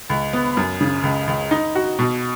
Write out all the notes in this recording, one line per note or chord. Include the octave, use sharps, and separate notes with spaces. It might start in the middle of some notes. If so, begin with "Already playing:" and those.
C#2
B3
F#2
C#3
C#2
C#2
D#4
F#4
B2